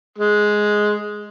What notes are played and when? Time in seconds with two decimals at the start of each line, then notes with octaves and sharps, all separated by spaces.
0.18 G#3